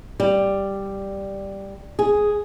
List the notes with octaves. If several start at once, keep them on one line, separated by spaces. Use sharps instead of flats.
G3
G#4